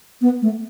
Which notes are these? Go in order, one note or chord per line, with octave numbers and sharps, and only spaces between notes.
B3
A3